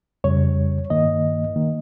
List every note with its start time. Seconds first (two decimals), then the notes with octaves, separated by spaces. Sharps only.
0.24 F2 C#3 G3 C#5
0.90 G2 D#3 A#3 D#5
1.56 D#3 A#3